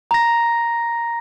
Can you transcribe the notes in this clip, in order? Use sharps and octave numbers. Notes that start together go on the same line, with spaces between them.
A#5 A#6